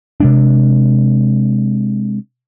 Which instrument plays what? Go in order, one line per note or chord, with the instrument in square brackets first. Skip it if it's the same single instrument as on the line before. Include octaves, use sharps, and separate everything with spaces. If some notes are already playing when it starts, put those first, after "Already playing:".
[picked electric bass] C3 G#3 D4